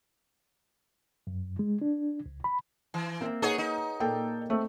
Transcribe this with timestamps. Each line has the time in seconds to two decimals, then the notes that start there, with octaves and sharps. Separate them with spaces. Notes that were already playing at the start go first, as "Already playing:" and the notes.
1.27 F#2
1.59 G#3
1.82 D4
2.26 C#2
2.44 B5
2.94 E3
3.21 A#3 C4 E5
3.42 D#4 G#4 B4 C#5 F#5 G#5
3.58 D#4
4.00 A#2 A#3 A4 G5
4.50 A3 C4